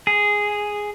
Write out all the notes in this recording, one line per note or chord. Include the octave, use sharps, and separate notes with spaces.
G#4